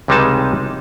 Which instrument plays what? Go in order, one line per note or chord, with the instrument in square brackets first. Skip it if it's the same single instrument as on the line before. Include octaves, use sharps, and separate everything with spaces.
[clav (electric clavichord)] C#2 C3 G3 G#3 D#4 A5